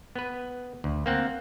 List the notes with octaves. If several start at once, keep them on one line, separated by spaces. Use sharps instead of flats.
B3 B4
D2
A#3 C4 F#5